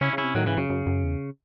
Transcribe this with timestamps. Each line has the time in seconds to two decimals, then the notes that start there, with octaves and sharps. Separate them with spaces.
0.01 C#3 C#4 E4
0.13 C#3
0.18 C#4 E4
0.24 C3
0.35 A2 D#3 F#3
0.46 G#2 C#3 E3
0.58 F#2 C#3
0.70 F#2
0.87 F#2
1.04 E2